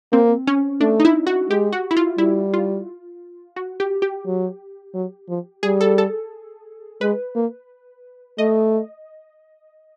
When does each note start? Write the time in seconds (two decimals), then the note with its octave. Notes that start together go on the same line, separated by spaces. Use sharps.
0.12 A#3 C4
0.47 C#4
0.81 A3 D4
1.00 D#4
1.05 E4
1.27 F#4
1.50 G#3 G4
1.72 F#4
1.91 E4
1.97 F4
2.18 G3 E4
2.54 F4
3.56 F#4
3.80 G4
4.02 G4
4.26 F#3
4.94 F#3
5.28 F3
5.63 G3 G#4
5.81 A4
5.98 A4
7.01 G#3 B4
7.35 A#3
8.38 A3 D#5